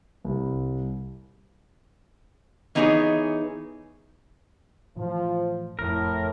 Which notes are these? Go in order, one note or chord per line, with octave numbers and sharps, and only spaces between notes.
C2
E3 B3 D4 D#4 G#4 C#5
A2 E3 F3
F#1 F2 A2 A#4